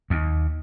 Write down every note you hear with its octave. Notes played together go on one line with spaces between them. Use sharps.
D#2